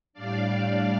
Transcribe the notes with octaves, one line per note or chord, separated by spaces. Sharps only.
A2 G3 D4 D5 F5